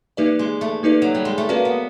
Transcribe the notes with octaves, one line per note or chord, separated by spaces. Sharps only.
E3 A#3 D#4 G4 B4 D5
G#3
A3
A#3 D#4 G4 B4 D5
F#3
G3
G#3
A3
A#3 C#4 F#4 B4 D5
B3